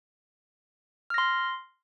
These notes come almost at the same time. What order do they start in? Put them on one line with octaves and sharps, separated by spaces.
F6 A#6 C6